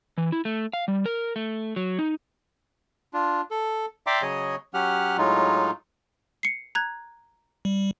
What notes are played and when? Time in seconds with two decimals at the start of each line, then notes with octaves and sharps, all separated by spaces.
0.18 E3
0.32 E4
0.45 A3
0.73 F5
0.88 G3
1.06 A#4
1.36 A3
1.76 F#3
1.99 D#4
3.14 D4 F4
3.51 A4
4.07 D5 E5 G5 A#5 C6 D6
4.22 C#3 F#3 G#4 C#5 D#5
4.74 F#3 C#4 G4 F#5 F6
5.18 A2 F#3 G#3 D#4 F4
6.43 C7 C#7
6.75 A#5 F#6 G#6
7.65 G3